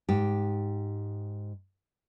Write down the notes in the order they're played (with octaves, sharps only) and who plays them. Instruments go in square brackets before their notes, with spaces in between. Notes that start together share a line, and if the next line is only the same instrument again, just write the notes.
[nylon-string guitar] G#2 G4